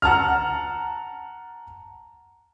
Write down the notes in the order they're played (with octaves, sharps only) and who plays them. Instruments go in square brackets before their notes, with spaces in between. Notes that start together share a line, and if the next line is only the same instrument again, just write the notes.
[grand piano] F#5 A5 A#5 F6